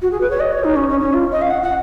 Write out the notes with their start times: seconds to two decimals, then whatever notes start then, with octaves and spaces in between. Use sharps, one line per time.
0.02 F#4
0.11 G#4
0.20 B4
0.30 C#5
0.40 D#5
0.52 C#5
0.64 D#4
0.76 C#4
0.89 C#4
1.00 C#4
1.13 F4
1.32 D#5
1.42 F5
1.50 F#5
1.62 F#5